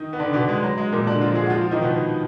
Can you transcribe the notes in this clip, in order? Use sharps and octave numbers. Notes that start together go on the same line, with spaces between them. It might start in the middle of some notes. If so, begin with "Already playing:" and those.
Already playing: D#3 D#4
B3
D3 D4
B2 B3
G#3
F#3
G#3
A#2 A#3
D3 D4
F3 F4
G#3 G#4
F#4
F3 F4
F3 F4
D#3 D#4
B2 B3